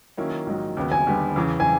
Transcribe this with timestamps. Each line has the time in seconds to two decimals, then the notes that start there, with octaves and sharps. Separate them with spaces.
0.17 D#3 F#3 A#3 C#4 E4
0.46 A#1 G#2 D#3 F#3
0.77 D#2 C#3 F#3 B3
0.92 G#5
1.07 D#2 D3 G3 B3
1.36 E2 C#3 E3
1.60 G#5